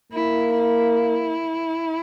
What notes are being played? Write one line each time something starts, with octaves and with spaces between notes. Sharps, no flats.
A#3 E4
E4